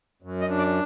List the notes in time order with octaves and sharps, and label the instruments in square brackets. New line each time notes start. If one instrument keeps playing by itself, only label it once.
[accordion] F#2
D#5
D4
D5